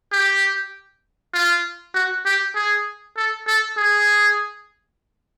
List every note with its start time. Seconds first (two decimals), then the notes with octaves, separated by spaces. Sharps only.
0.12 G4
1.34 F4
1.94 F#4
2.25 G4
2.56 G#4
3.17 A4
3.47 A4
3.77 G#4